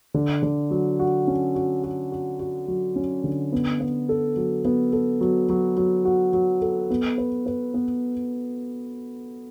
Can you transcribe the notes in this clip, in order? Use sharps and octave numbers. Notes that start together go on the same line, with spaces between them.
D3
D3
F#3
F#4
C#4
F#4
F#4
F#4
F#4
F#3
C#4
D3
B3
B3
A4
F#3
B3
A4
F#3
F#3
F#3
F#4
F#3
A4
B3
B4
B4
B3